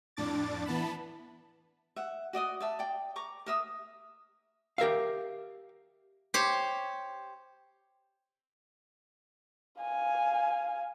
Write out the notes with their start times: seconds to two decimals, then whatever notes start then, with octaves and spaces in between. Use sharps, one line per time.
0.17 F2 A2 D4 D6 A6
0.66 E3 B3 A5 B5
1.96 E5 F#5
2.33 F#4 D5 D#5 D#6
2.60 D5 E5 A5
2.79 D5 G5
3.16 A#5 C#6 D6
3.46 A#4 E5 D#6
4.78 G4 A#4 E5 F5
6.34 G4 C5 C#5
9.82 F5 G#5